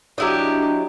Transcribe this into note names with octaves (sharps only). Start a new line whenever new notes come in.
F#3 D4 E4 G4 D#5